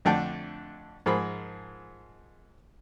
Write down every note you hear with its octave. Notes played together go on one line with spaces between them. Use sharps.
F2 D3 A3 D4 G5 A5
G#2 F3 G#4 A#4 B5